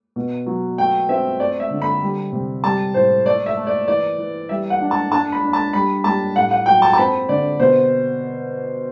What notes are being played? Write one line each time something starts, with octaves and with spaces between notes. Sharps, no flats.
B2
F#3
A3 G5
C4 E5
A3 D5
E5
D3
B5
G3
C3
G3 A5
A2 C5
A3 D5
E5
A3
D5
E3 D5
E3
G3 E5
F#5
D4
A5
D4 A5
B5
D4
A5
G3 B5
G3 A5
A2 F#5
F#5
F#3 G5
A5
A5
C4 B5
D3 D5
B2 C5